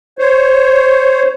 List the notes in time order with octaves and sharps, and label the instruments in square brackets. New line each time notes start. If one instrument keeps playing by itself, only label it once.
[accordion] C5 C#5